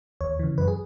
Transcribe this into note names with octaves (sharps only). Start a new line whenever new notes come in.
D#2 C#5
C#3 E3
F#2 B4
G#4